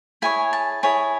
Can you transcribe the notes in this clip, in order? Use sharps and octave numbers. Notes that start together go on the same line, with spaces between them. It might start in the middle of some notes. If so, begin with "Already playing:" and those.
E4 G#4 C#5 G#5
A5
E4 G#4 C#5